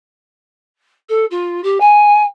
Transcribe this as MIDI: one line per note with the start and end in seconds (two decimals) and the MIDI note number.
1.09 1.25 69
1.31 1.61 65
1.64 1.78 67
1.80 2.23 80